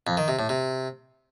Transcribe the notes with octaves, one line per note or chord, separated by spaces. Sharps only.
F2
D#3
C3
A2
C3